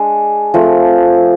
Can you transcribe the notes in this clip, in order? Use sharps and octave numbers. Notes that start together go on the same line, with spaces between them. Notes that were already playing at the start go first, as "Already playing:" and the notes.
Already playing: G#3 D4
F3 A3 C4